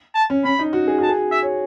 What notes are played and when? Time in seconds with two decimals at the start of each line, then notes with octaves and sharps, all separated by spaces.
0.15 A5
0.30 C#4
0.44 C#4 B5
0.59 D#4
0.73 F#4
0.88 G#4
0.98 F#4 A5
1.09 G#4
1.32 E5
1.43 C#5